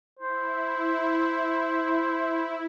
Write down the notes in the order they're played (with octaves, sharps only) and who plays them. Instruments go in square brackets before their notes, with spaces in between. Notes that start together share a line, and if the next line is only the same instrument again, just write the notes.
[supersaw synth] E4 [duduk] C5